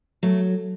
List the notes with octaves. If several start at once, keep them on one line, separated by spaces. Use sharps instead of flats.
F#3 A3